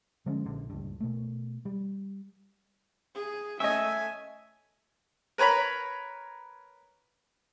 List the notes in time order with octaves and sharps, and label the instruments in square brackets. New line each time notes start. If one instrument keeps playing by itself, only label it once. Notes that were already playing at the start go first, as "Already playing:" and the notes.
[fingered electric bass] D3 F3 G#3 C#4
A#1 D3
C#2 G2
B2 A3
G3
[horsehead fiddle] G#4
[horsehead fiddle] A3 G#5 [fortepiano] C#4 D#5 [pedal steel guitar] E5
[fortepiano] A#4 B4 C#5 A#5 B5